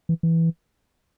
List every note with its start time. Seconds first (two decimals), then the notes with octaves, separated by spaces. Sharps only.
0.09 E3
0.23 E3